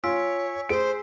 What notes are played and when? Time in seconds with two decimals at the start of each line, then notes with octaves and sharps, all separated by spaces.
0.04 F4 C#5 G#5 E6 B6
0.69 G#4 C5 D7